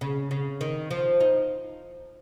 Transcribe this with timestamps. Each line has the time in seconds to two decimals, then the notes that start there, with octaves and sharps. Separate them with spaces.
0.01 C#3
0.31 C#3
0.61 D#3
0.91 F3
1.20 D#4